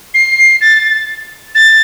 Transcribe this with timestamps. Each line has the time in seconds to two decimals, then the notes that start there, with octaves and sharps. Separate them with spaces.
0.14 C7
0.61 A6
1.55 A6